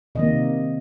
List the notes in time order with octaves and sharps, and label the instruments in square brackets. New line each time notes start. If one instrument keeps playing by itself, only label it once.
[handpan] C3 D#3 A#3 D#5